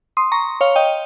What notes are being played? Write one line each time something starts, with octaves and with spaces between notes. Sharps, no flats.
C6 D#6
A#5 C#6
C#5 F5
D#5 G5